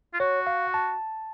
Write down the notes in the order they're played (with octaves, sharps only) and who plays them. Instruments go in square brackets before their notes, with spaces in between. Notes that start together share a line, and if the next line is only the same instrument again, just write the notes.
[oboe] F4
[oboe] F#4 [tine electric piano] C#5
[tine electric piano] F5
A5